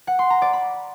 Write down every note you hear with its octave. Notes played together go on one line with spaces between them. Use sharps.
F#5
C6
A#5
D5
B5